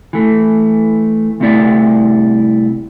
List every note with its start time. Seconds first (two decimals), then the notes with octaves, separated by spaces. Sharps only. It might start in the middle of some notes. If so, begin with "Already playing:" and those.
0.13 E3 A3
1.40 C2 A3 C4 E4 D5